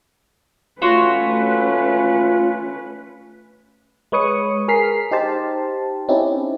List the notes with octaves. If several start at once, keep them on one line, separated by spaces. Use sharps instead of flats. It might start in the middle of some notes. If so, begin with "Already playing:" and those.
A3 C#4 F4 F#4 B4 C#5 C6
G#3 B4 C#5 D#6 C#7
G#4 A#4 F6 B6 C7
D#4 G4 C5 A5
C4 C#4 D#4 E4 G4